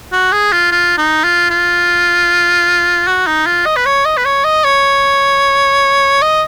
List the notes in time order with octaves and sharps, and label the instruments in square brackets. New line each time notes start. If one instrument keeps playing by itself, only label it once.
[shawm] F#4
G#4
F4
F4
D#4
F4
F4
F#4
D#4
F4
D#5
B4
C#5
D#5
B4
C#5
D#5
C#5
D#5